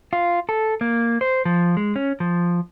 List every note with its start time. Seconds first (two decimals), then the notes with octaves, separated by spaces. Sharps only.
0.13 F4
0.49 A4
0.81 A#3
1.21 C5
1.45 F3
1.77 G#3
1.96 C#4
2.20 F3